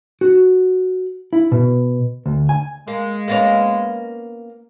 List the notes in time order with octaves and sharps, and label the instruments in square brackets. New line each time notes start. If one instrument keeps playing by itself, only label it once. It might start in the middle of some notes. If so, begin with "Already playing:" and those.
[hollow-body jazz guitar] F#4
E4
B2
D2
G#5
[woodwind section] G#3 [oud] A#3
[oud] A#3 B3 C#4